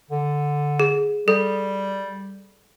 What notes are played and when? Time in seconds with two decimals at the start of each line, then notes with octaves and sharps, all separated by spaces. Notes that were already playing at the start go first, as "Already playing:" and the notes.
0.10 D3
0.80 G#4
1.28 G3 A4